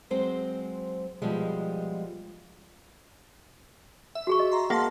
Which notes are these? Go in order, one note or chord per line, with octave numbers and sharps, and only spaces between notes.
F#3 G#3 C4 C5
B2 F3 G3 G#3
E5
F#4 G#4 C#6
D#5
A#5 C6
A#3 G#4 F5 F#5 A5 C6